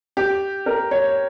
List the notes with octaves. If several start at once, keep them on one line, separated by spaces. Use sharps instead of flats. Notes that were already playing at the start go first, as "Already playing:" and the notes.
G4
A#4
C#5